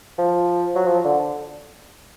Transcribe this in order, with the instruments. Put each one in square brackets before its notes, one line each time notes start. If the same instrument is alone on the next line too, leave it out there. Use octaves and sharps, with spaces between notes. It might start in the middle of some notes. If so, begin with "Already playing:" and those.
[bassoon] F3
F#3
F3
D3